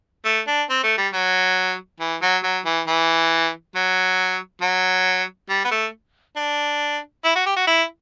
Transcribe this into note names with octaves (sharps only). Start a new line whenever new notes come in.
A3
D4
C4
A3
G3
F#3
E3
F#3
F#3
E3
E3
F#3
F#3
G3
B3
A3
D4
E4
F#4
G4
F#4
E4